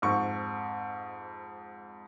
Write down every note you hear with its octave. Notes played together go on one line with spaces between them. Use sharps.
F2 G#2 C#6